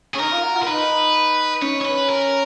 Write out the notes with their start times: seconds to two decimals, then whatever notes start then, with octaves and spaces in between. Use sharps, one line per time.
0.14 C#4 G#4
0.19 D#4 A#4
0.32 F4
0.43 F#4
0.55 F4
0.63 A#4
0.67 D#4 B4
1.62 C#4 C#5
1.81 C#5
1.85 B4
2.09 A#4